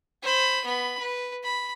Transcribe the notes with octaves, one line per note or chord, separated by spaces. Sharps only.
C5 B5
B3 B5
B4
B5